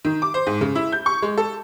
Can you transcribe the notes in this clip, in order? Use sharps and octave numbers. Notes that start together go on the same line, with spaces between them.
D#3
D6
C5
G#2
C#3
E4
G6
C#6
G#3
A4